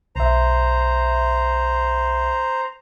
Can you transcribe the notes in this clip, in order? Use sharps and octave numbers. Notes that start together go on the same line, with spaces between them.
B1 C5 E5 A#5